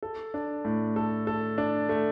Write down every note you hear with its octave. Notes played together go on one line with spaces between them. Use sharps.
A4
D4
A2
A4
A4
D4
A3